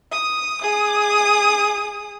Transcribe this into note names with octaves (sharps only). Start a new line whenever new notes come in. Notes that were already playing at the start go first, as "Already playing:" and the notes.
D#6
G#4 D#6